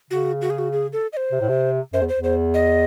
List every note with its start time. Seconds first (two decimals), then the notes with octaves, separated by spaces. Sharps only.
0.11 C#3 F#4
0.42 F#4
0.50 G#4
0.59 F#4
0.73 G#4
0.93 A4
1.13 D#5
1.17 C5
1.32 C3
1.41 A2
1.49 C3
1.93 F#2 C5
2.01 E2
2.09 C5
2.16 E2
2.24 C5
2.54 D#5